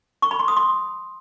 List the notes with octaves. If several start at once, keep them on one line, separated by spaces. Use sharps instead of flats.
C#6
B5
C6
D#6
C6